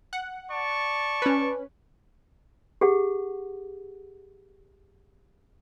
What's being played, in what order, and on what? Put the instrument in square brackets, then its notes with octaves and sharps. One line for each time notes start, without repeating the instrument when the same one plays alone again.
[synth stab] F#5
[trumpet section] D5 A5 C#6
[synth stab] C#4 B4
[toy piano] G4 G#4 F#5